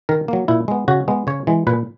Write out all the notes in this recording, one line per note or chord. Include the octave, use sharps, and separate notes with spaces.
D#3 A#4
F#3 A#3
A#2 E4
G#3 B3
C#3 F#4
G#3 B3
C#3 C#5
E3 G#3
A#2 B4